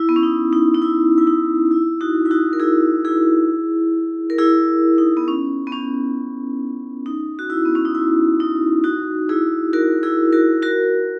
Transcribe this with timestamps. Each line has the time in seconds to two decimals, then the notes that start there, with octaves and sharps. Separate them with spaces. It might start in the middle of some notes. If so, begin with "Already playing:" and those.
Already playing: E4
0.09 B3
0.16 C#4
0.23 D#4
0.53 D#4
0.75 D#4
0.82 E4
1.18 E4
1.27 D#4
1.71 E4
2.01 D#4 F#4
2.25 E4
2.31 D#4 F#4
2.53 A#4
2.60 E4 G#4
3.05 E4 G#4
4.30 A#4
4.39 E4 G#4
4.98 D#4
5.17 B3
5.28 C#4
5.67 B3
5.72 C#4
7.06 D#4
7.39 F#4
7.50 E4
7.66 B3
7.75 C#4
7.85 D#4
7.95 E4
8.40 D#4
8.84 D#4 F#4
9.29 E4 G#4
9.73 F#4 A#4
10.03 E4 G#4
10.33 F#4 A#4
10.62 F#4 A#4